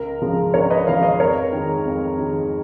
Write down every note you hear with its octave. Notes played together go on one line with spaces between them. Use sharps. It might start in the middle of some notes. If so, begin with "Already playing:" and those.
Already playing: C#2 A#4
C#3 F3 G#3
C#2 A#4 C#5
B4 D#5
C#3 F3 G#3 C#5 F5
B4 D#5
F2 A#4 C#5
D#3 G#3
F2
D#3 G#3